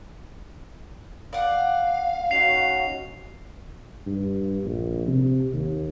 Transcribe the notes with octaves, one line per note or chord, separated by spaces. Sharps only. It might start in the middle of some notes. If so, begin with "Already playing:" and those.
D5 F5 F#5
C#4 D#4 F#4 C7 F7
G2
A#1
C3
D#2